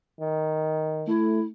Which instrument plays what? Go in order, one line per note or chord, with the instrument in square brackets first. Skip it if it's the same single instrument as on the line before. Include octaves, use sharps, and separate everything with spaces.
[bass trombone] D#3
[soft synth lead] A3 [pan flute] E4